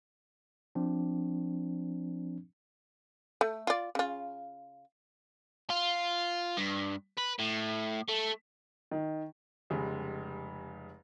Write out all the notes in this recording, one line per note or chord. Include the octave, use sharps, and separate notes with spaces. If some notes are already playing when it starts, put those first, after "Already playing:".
F3 C4 D4
A3
F4 D5
C#3 F4
F4
G2
B4
A2
A3
D#3
F1 C#3 G3 G#3